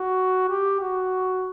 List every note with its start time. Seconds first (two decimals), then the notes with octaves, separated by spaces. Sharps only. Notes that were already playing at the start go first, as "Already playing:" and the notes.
Already playing: F#4
0.49 G4
0.81 F#4